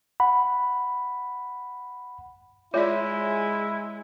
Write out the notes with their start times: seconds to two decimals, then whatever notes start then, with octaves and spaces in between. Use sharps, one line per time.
0.20 F#5 B5
2.74 G#3 E4 F4 C#5 D5 E5